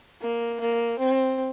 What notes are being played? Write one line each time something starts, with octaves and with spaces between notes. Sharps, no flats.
A#3
A#3
C4